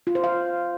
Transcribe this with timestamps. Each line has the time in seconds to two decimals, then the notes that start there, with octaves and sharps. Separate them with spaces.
0.07 F4
0.15 C5
0.24 F5